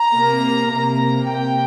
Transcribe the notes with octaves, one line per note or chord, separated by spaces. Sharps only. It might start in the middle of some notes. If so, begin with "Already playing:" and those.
Already playing: A#5
C3 A#3
C3 A#3 A#5
C3 A#3 G5